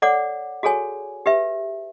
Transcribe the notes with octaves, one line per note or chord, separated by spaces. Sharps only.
A4 C#5 D5 F#5 D6
F#4 G#4 A4 C#5 G#5
G4 B4 E5